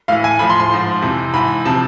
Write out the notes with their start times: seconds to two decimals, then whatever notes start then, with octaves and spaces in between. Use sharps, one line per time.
0.08 A2 E3 F5
0.24 G#5
0.39 A2 F3 B5
0.50 C6
0.60 C6
0.71 G#2 F3
1.02 F2 C3 E3
1.34 G#2 E3 B5
1.65 C3 F3 A5